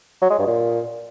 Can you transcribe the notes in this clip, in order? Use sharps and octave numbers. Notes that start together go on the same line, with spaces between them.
F#3
G#3
G2
A#2